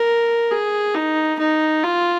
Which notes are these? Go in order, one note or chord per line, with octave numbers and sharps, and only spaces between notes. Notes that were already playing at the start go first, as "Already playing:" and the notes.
Already playing: A#4
G#4
D#4
D#4
F4